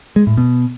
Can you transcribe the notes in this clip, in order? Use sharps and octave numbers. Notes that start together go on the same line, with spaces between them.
G#3
A2
B2